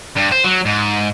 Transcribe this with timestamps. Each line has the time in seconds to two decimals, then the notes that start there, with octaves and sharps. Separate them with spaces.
0.17 G2
0.32 C5
0.44 F#3
0.66 G#2